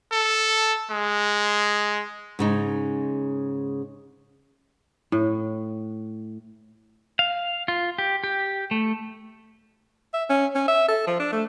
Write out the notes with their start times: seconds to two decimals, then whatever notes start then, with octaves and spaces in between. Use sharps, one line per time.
0.12 A4
0.91 G#3
2.39 G#2 C#3 D#4
5.12 A2
7.19 F5
7.68 F4
7.98 G4
8.24 G4
8.71 A3
10.13 E5
10.30 C#4
10.55 C#4
10.68 E5
10.88 A4
11.07 F3
11.19 D4
11.33 A3